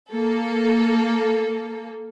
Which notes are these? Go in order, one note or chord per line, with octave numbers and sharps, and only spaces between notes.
A#3 A4